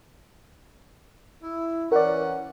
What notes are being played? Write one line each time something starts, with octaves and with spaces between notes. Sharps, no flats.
E4
E3 C#4 A#4 D5 F#5